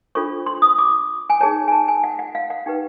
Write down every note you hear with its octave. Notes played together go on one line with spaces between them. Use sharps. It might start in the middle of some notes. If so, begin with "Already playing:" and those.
D4 F4 A4 C5 C#6
C6
D#6
D6
G#5
D#4 G#4 C#5 A5
G#5
A5
G#5
F#5
F#5
F5
F#5
D#4 G4 B4 G5